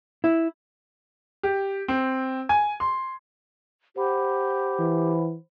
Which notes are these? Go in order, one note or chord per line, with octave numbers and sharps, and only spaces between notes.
E4
G4
C4
G#5
C6
G4 C5 F#5 B5
E3